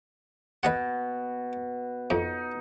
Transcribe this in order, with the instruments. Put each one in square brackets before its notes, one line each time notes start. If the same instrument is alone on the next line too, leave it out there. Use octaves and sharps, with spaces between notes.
[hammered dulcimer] B2 [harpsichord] B4 D#5 F#5
[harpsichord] F2 [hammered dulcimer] D#4